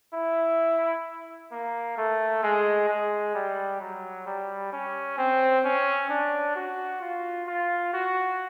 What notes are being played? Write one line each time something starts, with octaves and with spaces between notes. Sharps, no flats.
E4
A#3
A3
G#3
G#3
G3
F#3
G3
C#4
C4
C#4
D4
F#4
F4
F4
F#4